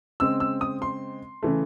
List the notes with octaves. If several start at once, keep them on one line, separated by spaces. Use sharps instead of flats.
C#3 G#3 C4 E6
E6
D#6
C6
C#3 E3 A3